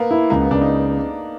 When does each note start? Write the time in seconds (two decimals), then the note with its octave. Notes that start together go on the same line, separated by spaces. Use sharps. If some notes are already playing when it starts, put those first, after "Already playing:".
Already playing: A#3 B3
0.11 E4
0.30 C#2 A#3
0.41 B3
0.51 C#2 D4
0.62 D#4